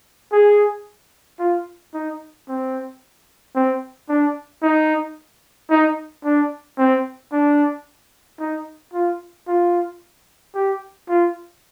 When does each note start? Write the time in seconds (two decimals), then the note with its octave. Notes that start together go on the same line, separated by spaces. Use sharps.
0.32 G#4
1.40 F4
1.94 D#4
2.48 C4
3.56 C4
4.09 D4
4.62 D#4
5.71 D#4
6.25 D4
6.78 C4
7.32 D4
8.40 D#4
8.93 F4
9.47 F4
10.55 G4
11.09 F4